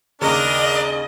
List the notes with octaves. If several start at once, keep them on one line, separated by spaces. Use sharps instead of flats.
D#2 C#3 D4 A#4 D#5